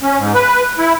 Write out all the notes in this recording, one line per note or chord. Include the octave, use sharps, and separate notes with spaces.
C#4
G#2
B4
E4